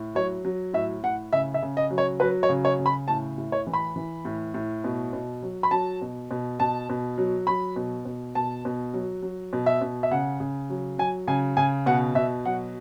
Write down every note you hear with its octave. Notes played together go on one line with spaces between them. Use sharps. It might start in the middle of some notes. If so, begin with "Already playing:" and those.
Already playing: A2
F#3 C#5
F#3
A2 E5
A2 F#5
C#3 E5
E5
C#3
D#5
F#3
C#5
F#3 B4
C#5
C#3
C#5
C#3
B5
A2 A5
A2
C#5
E3
B5
E3
A2
A2
B2
B2
F#3
B5
F#3 A5
B2
B2
B2 A5
B2
F#3
F#3 B5
B2
B2
B2 A5
B2
F#3
F#3
B2
E5
B2
E5
C#3 F#5
C#3
F#3
F#3 G#5
C#3 G#5
C#3 G#5
B2 F#5
B2 E5
F#3 F#5